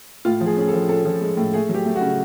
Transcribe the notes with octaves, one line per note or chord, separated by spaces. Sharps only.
A2 F4
F3
G#4
C#4 G#4
A4
F3
C#4 A4
F3
G#3
A2
A3 G#4
F#3
G4
A3
F#4
C#3